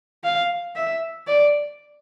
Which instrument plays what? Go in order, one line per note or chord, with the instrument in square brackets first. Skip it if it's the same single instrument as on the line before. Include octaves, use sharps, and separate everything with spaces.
[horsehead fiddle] F5
E5
D5